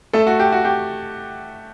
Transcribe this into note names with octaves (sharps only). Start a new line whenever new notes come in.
A3 A4
F#4
G4
F#4
G4